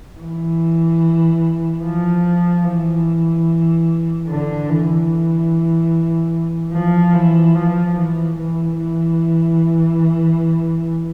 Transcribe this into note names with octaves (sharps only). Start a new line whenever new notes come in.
E3
F3
E3
D3
E3
F3
E3
F3
E3
E3
E3